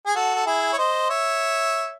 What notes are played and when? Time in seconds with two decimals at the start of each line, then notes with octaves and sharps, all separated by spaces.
0.07 G#4
0.15 F#4 A4
0.36 A4
0.47 E4 G#4
0.73 C#5
0.78 C5 D#5
1.09 C#5 E5